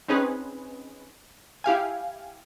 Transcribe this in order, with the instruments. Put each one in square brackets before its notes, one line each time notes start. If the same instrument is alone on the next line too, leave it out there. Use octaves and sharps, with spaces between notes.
[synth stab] C4 C#4 D#4 G#4 B4
E4 G4 F5 G#5